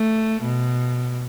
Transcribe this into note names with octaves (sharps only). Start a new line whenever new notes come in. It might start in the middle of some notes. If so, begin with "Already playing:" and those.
Already playing: A3
B2